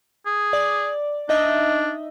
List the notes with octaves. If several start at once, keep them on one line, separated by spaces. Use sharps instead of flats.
G#4
D5
D4 D#4 D#5 E5